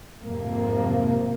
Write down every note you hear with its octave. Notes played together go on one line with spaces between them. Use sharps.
F2 G#2 C3 F3 A#3